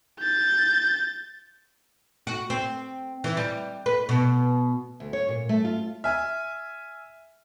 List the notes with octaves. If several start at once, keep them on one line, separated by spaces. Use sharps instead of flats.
G6 A6
F#4
C4
E3
G3
B4
B2
D2
C#5
A#2
A3
F4
E5 G#5 F6